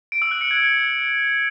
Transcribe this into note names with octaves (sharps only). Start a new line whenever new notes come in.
D7
E6
F#6
C#7
G#6